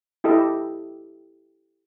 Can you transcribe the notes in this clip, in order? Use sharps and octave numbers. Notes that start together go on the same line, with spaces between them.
E4 G4 A4 D#5